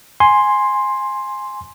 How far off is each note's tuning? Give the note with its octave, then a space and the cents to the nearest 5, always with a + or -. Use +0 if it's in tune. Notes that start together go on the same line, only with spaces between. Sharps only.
G#5 +0 C6 +5